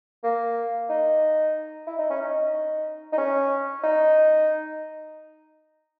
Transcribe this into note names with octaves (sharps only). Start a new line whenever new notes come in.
A#3
D#4
E4
D#4
C#4
D#4
D#4
C#4
D#4